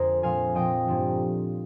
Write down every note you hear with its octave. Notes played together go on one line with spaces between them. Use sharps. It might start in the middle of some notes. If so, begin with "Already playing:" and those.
Already playing: F2 D3 G#4 A#4 C5
A#2 F3 G#3 C4 F5 G#5
A#2 F3 G#3 C4 D#5 G5
G2 D3 F3 A#3